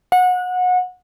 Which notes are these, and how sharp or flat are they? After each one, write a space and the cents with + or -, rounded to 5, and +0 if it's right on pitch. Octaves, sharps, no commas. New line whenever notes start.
F#5 -25